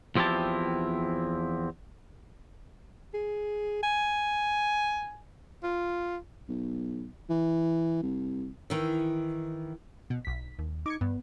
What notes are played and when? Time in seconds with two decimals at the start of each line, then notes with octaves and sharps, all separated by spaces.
0.15 E2 F3 C4 E4 G4 A5
3.14 G#4
3.83 G#5
5.63 F4
6.49 B1
7.30 E3
8.02 C2
8.70 D#3 E3
10.10 B2
10.25 B1 B6
10.59 D#2
10.86 D#4 D6 G#6 C#7
11.01 G2 B3